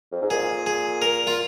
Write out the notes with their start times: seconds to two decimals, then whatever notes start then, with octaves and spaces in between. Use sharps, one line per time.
0.12 F2
0.22 G#2
0.30 A#2 G#4
0.66 G#4
1.02 A#4
1.27 F4